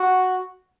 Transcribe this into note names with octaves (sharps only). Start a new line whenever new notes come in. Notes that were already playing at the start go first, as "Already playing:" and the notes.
Already playing: F#4